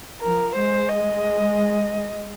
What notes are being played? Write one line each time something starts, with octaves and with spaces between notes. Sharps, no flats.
F3 A#4
G#3 C5
D#5